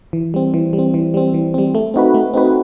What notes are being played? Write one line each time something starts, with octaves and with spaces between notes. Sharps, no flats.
E3
G3 C4
E3
G3
C4
E3
G3 C4
E3
G3 C4
A3
C4 D#4 F#4 B4
A3
C4 D#4 F#4 B4